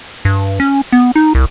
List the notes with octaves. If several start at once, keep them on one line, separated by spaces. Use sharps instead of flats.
G2
C#4
B3
D#4
C2